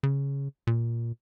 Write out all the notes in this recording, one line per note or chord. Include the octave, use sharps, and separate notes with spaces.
C#3
A#2